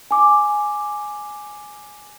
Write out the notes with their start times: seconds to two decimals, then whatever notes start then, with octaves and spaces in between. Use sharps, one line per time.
0.11 G#5 D6